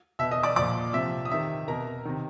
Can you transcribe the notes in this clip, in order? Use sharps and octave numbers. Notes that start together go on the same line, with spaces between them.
B2 E5 E6
D#5 D#6
D5 D6
A#2 F3 D5 D6
C3 F3 E5 E6
D#6
C3 D#3 E5 E6
B2 A#4 A#5
C3 D#3